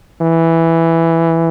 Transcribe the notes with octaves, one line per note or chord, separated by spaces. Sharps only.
E3